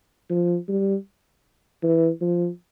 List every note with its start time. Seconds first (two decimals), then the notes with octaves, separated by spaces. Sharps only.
0.30 F3
0.69 G3
1.83 E3
2.21 F3